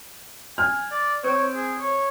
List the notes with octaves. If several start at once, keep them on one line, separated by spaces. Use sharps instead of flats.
G#5 F6
D5
C4 C#5
G#4
C#5